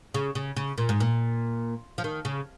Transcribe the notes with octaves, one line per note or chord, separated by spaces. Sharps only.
C#3
C#3
C#3
A#2
G#2
A#2
F3
D#3
C#3